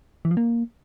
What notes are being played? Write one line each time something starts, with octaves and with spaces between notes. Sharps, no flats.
E3
F3
A#3